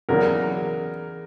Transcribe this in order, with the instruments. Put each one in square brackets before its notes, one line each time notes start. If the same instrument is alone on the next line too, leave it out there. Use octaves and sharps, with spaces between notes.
[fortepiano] E2 C#3 F#3 A#3 D4 [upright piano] A#4